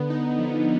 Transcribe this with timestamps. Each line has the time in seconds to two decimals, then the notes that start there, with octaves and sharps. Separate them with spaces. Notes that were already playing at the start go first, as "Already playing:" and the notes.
Already playing: D3 B3
0.10 D#4
0.38 F3